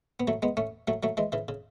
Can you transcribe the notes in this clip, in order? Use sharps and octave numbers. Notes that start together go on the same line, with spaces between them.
B3
F#3 A3
G#3 B3
A3 C#4
F#3 A3
F#3 A3
E3 G#3
C#3 E3
C#3